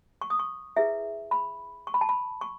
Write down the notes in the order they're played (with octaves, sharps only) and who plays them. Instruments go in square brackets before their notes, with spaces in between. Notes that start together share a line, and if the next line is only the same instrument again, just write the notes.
[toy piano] C#6
D#6
C#6
E4 G#4 B4 E5
B5
C#6
B5
A5
B5
C#6